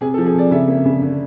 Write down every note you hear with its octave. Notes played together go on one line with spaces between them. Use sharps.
C3 G#4
A4
F3
G#4
C3 D5
C#3 E5
A#3
C#3
D3